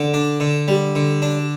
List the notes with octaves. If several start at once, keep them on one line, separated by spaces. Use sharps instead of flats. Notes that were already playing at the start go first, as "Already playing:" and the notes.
Already playing: D3 D6
D4
D3
G3
D3
D4